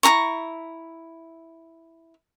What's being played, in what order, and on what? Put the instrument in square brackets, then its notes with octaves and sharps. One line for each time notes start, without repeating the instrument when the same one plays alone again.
[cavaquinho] E4 G#4 A#5 C#6